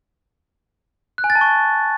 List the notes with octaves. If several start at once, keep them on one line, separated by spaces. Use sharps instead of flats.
F#6
G#5
A6
A5
C#6